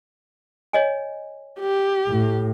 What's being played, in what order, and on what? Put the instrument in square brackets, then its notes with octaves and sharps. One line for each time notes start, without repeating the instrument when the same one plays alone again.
[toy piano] C#5 D#5 G#5
[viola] G4
[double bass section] A2